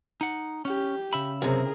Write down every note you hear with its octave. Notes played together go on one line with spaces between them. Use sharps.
D#4 F#5
C#4 G4
C#3 E5 B5
F#2 C3 G#4 A#4